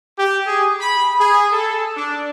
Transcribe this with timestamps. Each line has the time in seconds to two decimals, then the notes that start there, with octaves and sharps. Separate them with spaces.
0.18 G4
0.47 G#4
0.79 B5
1.19 G#4
1.52 A4
1.96 D4